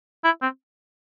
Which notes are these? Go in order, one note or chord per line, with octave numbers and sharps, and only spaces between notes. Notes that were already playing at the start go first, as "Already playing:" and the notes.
E4
C4